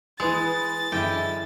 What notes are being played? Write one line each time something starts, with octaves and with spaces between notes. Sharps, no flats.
E3 G#3 B4 D#6 A6
F#2 D3 E3 G#3 E4 G5